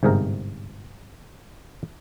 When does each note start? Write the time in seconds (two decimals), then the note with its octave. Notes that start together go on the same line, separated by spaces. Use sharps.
0.03 G1 G#2 C3 G#4 A#4